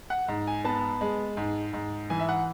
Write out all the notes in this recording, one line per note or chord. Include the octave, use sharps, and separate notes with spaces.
F#5
G#2
G#5
B3 A5
G#3
G#2
G#2
E3 G#5
E5
F#5